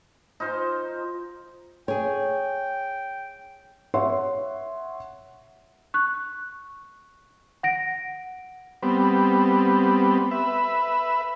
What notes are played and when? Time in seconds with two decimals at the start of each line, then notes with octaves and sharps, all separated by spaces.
0.40 D#4 F4 C5 G#5
1.88 G#4 C#5 G5
3.94 C#5 E5 F#5 C6
5.94 C#6 F#6
7.63 F#5 A#6 D7
8.83 G3 B3 C4
10.31 B4 E5